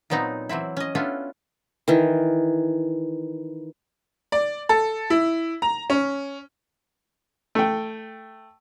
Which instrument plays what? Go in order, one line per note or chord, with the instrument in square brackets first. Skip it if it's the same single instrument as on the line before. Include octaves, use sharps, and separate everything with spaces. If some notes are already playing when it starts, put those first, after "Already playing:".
[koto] A#2 F#3 B3 C4 D#4
E3 F#3 C4 E4
C#4 D#5
B3 C#4 D4 E4 F4 A4
[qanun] D#3 E3
[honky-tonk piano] D5
A4
E4
A#5
C#4
[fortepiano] A3 G5